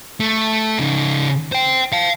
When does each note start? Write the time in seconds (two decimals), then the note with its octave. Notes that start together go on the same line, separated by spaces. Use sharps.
0.20 A3
0.79 C#3 D#4
1.52 C5 G5
1.93 F5 A5